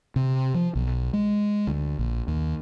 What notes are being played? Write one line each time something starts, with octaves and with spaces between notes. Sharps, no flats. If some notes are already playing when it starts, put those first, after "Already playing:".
C3
F3
B1
G#3
D2
A#1
D#2